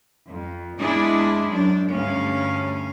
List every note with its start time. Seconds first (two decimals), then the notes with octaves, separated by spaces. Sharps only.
0.29 F2
0.79 E2 G#3 D4 E4 G#4
1.49 F#2 D4
1.92 D2 G2 C#4 F5